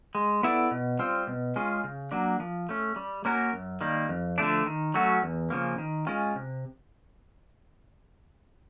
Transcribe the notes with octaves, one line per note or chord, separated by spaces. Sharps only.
G#3
B3 E4 A4 D5
B2
G3 C4 F4
B2
G#3 C#4 F4 G#4
C#3
F#3 A#3 D4
F3
A3 C#4
G3
A#3 C#4 F#4 A#4
F#2
D#3 G3 A#3
F2
D3 F3 A3 D4
D#3
F#3 A3 C#4 F#4
E2
C#3 F3 A#3
D#3
G#3 C#4 F4
C3